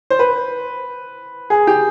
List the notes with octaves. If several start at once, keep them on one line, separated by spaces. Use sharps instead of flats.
C5
B4
G#4
G4